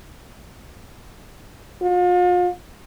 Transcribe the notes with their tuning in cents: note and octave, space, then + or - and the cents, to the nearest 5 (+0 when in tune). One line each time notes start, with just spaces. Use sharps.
F4 +40